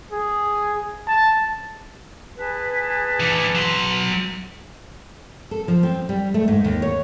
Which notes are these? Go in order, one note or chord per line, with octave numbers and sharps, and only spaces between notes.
G#4
A5
G#4 B4 A5
E3 D4
F#3 C6
A4
F3
C4
G3
A3
G#2
D#2
C#5